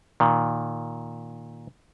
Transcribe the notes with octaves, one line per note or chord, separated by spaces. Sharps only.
A#2 D#3